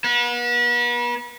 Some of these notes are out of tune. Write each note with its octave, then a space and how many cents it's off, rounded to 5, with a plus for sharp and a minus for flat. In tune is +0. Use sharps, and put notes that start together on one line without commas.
B3 -40